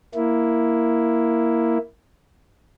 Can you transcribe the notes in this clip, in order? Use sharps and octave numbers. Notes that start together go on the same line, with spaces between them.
A#3 E4